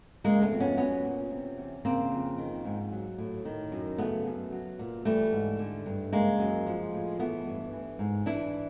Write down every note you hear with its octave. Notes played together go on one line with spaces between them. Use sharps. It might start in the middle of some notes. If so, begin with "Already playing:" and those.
C#3 G#3 A#3
A3 B3
F2
B3 C#4
F#3 B3 C#4
A#2
C3
E2
C#3 A#3 C4
F2
D#3
G#2
F#3
A2
D#3
F#2
C#3 A3 B3
F#2
F#3
A#2
E3 G3 A3
G#2
D3
G2
C#3 G#3 A#3
F#2
F3
A2
E3 A3 B3
G2
E3
G#2
E3 D4 E4